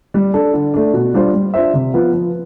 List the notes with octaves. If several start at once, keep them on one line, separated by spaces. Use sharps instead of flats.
G3
D4 A4
D3
A3 D4
B2
G3 D4 F4 C5
G3
D4 F4 C5 E5
C3
F3 B3 F4 B4
F3